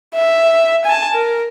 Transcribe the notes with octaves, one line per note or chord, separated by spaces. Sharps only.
E5
G#5 A5
A#4